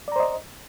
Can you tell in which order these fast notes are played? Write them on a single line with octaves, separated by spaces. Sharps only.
D5 A#5 C5 D#5